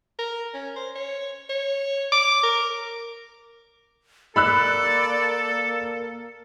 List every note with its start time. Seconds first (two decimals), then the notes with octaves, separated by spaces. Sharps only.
0.19 A#4
0.54 C#4
0.76 C5
0.96 C#5
1.49 C#5
2.12 D6
2.43 A#4
4.36 A#3 A4 A#4 D5 B5 E6 F#6